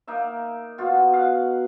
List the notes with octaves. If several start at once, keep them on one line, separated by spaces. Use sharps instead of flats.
A#3 D#4 E5
B2 F4 F#4
F5 F#5